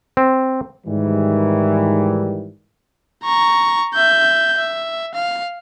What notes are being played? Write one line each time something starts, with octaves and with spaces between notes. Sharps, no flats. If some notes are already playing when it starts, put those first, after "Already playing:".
C4
G#2 D#3 E3 G3
A#5 C#6
E5 G6
E5
F5